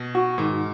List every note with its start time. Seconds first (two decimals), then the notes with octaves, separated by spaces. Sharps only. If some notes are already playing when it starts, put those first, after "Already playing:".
Already playing: B2
0.15 F#4
0.38 G#2 D#3